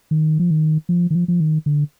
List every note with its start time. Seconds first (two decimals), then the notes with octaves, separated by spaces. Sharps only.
0.11 D#3
0.39 F3
0.51 D#3
0.89 F3
1.10 D#3
1.15 F3
1.28 F3
1.40 D#3
1.66 D3